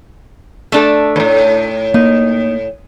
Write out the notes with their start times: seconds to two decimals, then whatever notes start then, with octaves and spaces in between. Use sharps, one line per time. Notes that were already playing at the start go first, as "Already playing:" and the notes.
0.72 A3 D4 A4
1.16 D#2 A2
1.94 A#3 D#4